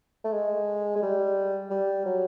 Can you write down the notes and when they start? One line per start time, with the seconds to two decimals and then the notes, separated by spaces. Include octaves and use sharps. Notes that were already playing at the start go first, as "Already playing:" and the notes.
0.24 A3
0.33 G#3
0.95 G#3
1.02 G3
1.70 G3
2.05 F#3